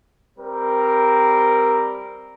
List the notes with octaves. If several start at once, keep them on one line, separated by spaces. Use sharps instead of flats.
G3 C4 A#4